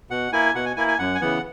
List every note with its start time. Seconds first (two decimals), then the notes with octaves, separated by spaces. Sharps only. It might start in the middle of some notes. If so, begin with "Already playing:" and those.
0.10 B2 F#5
0.33 A#3 E4 G#5
0.55 B2 F#5
0.66 G#5
0.76 A#3 E4 G#5
0.88 G#5
0.99 F#2 F#5
1.15 G#5
1.21 C#3 E3 B3 F#5